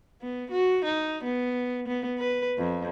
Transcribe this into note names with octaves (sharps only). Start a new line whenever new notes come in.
B3
F#4
D#4
B3
B3
B4
F2